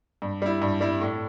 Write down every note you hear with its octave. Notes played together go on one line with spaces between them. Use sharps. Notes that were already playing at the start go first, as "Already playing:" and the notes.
G2
G3 E4
G2
G3 E4
A2